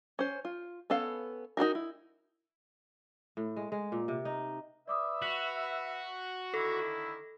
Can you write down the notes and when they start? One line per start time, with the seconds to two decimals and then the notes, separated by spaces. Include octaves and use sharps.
0.19 C#4 C5
0.45 F4
0.90 B3 C#4 A4 F5
1.57 D#4 F4 F#4 A#4
1.75 E4
3.37 A2
3.56 G#3
3.72 G#3
3.92 A#2
4.08 C3
4.25 D#4
4.88 B4 D5 E5 D6 D#6
5.22 F#4 B6 F7
6.54 D3 D#3 E4 A4 A#6